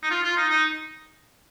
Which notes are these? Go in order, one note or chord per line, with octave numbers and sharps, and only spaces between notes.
D#4
F4
F4
D#4
D#4